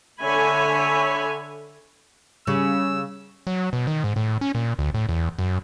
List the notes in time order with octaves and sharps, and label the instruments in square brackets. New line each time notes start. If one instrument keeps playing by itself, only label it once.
[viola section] D3 C#5 E5 G#5 B5
[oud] C#3 [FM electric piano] G3 C#5 [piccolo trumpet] E6
[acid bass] F#3
B2
D#3
G#2
A2
C#4
A#2
D2
A2
E2
F#2